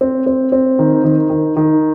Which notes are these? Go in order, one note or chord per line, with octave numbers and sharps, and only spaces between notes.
C4
C4
C4
D#3
D#3
D#3
D#3